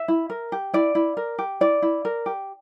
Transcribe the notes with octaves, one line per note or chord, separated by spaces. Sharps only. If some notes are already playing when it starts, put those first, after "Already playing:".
Already playing: E5
E4
A#4
G4
E4 D5
E4
A#4
G4
E4 D5
E4
A#4
G4